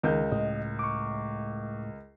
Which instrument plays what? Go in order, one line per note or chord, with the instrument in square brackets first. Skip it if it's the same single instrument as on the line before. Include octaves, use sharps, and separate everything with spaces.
[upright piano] C#2 A#4 G6 [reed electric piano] D#3
[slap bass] A2 G#3 [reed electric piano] D#5
[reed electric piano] C#6 D6